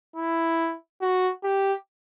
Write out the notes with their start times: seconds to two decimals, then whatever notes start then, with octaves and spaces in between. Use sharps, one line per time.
0.16 E4
1.02 F#4
1.44 G4